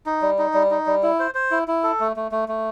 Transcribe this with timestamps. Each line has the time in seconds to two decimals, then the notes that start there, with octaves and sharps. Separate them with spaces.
0.06 D#4
0.22 G3
0.38 D#4
0.54 G3
0.71 D#4
0.87 G3
1.03 E4
1.19 C5
1.35 C5
1.51 E4
1.68 E4
1.83 A4
2.00 A3
2.16 A3
2.32 A3
2.48 A3